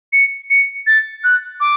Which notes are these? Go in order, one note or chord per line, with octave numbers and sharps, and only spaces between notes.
C#7
C#7
A6
F#6
D6